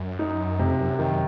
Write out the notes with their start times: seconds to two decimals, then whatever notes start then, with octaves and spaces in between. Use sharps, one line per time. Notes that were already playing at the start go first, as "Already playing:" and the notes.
Already playing: F#2
0.19 D#4
0.59 F2 C3
0.79 F#2
0.99 F#2 D#3